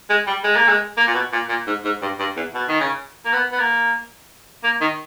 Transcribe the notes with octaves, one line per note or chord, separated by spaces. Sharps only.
G#3
G3
G#3
A#3
G#3
A#3
A#2
B2
A#2
A#2
G#2
G#2
G2
G2
E2
B2
D#3
C#3
A#3
B3
B3
A#3
A#3
D#3